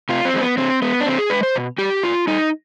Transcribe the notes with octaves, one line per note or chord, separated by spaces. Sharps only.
C3 F4
C4
F3 G#3
B3
D3 C4
G#3 B3
D4
D3 C4
G#4
G#3 B4
C5
B2
G3 G4
B2 F4
G3 D#4